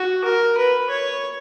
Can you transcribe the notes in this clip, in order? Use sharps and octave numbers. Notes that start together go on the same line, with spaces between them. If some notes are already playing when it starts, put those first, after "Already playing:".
Already playing: F#4
A#4
B4
C#5